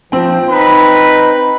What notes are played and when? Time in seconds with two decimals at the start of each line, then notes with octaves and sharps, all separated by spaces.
0.12 F3 C4 G5
0.50 D#4 B4 B5